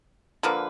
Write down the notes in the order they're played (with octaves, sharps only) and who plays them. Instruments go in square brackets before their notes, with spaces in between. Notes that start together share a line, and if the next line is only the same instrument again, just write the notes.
[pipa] D3 F3 A#3 B4